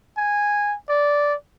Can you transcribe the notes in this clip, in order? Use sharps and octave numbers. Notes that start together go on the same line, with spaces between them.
G#5
D5